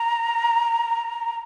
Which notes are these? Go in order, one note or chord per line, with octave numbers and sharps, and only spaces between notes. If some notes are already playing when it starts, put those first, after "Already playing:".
Already playing: A#5